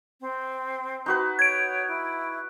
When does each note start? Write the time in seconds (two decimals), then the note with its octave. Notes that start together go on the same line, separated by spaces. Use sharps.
0.21 C4
1.06 D#4 F#4 B4
1.39 C#5 G#6 D7
1.88 E4